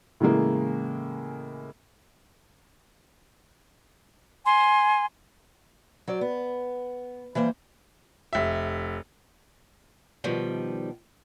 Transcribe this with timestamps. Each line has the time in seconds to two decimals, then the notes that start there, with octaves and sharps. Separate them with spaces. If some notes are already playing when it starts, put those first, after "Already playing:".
0.20 A2 C#3 E3 G#3 A#3
4.45 G#5 C6
6.08 F#3 C5 D5
6.21 B3
7.35 E3 G3 A#3 C5
8.33 F1 E5
10.24 B2 D#3 F3 G3